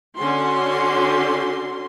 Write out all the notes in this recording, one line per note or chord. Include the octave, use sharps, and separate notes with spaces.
D3 C#4 F#4 C6